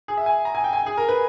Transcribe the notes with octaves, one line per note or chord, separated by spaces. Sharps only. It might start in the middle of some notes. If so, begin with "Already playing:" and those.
G#4
E5
G#5
A#5
G#5
G5
G#5
G#4
A#4
B4